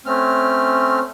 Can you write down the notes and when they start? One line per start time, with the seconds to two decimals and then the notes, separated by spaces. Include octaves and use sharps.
0.06 A3 C4 C#4 F6